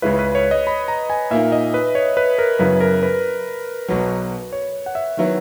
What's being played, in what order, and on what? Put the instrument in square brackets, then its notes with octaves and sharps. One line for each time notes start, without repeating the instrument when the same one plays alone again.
[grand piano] C#2 C#3 G#3 C#4 E4 [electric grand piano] B4
[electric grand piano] B4
C#5
D#5
B5
A#5
G#5
[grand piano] A#2 A#3 D#4 [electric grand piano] E5
[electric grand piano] D#5
B4
C#5
B4
A#4
[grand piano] F#2 C#3 F#3 B3 E4 [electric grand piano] B4
[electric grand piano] A#4
B4
[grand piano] B1 B2 F#3
[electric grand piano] C#5
F#5
E5
[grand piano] D#3 F#3 B3 E4